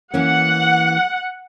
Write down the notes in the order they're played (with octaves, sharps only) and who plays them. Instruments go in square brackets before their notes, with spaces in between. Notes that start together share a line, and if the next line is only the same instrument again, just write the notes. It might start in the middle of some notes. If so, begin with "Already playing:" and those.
[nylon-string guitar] E3 A#3 C#4 [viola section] F#5